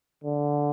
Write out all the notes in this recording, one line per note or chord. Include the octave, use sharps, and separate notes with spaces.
D3